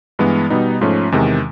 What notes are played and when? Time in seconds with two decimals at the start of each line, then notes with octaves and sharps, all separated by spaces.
0.19 G2 E3 G#3 B3
0.50 B2 G3 B3 D#4
0.81 G#2 F3 A3 C#4
1.12 E2 C3 D#3 G#3